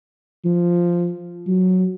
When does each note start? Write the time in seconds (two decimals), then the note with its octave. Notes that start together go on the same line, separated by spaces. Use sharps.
0.45 F3
1.48 F#3